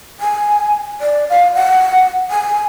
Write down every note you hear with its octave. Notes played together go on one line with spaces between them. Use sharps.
G#5
D5
F5
F#5
G#5